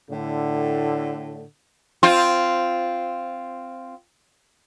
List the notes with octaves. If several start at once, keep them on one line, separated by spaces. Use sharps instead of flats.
A2 D3
C4 F4